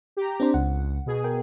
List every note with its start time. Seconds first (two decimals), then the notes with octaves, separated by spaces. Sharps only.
0.17 G4 A#5
0.40 C4 D4 C5
0.54 C#2 F#5
1.06 B2 G#4
1.24 A#4 G5